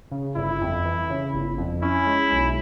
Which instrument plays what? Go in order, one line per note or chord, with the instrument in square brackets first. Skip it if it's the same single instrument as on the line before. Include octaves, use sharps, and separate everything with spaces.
[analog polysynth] C#3
[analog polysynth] G1 [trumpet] E4
[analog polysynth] F2
E3
C#3
G1
F2
[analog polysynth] C#4 [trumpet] E4
[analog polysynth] G#3
B1